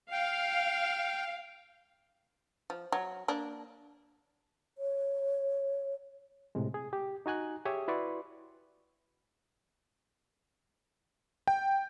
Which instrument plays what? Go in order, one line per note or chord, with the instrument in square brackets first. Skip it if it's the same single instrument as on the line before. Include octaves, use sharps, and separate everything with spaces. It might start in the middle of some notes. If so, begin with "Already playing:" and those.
[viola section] F5 [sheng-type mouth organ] G5
[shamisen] F3
F#3
A#3 D4
[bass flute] C#5
[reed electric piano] A2 C3 G#3
G#4
G4
D#4 F#4 G#5 F#6
G4 G#4 C#5 E5 D#6
E4 F#4 B4 D5 C6 C#6
[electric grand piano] G5